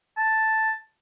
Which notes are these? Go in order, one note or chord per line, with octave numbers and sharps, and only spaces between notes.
A5